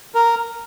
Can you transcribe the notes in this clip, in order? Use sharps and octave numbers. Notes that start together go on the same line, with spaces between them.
A#4